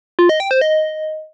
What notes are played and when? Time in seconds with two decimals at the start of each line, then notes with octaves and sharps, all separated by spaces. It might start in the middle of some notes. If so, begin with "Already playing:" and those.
0.19 F4
0.29 D#5
0.40 G5
0.51 C5
0.61 D#5